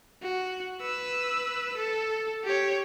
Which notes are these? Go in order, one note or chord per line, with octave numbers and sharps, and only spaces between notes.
F#4
B4 E6
A4
G4 C#5